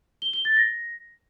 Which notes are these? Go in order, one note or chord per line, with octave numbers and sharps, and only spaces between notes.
G7
G7
A6
A#6